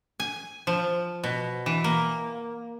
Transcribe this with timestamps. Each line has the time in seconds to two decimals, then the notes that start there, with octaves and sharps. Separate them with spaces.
0.20 G#5
0.67 F3
1.24 B2
1.66 E3
1.84 A#3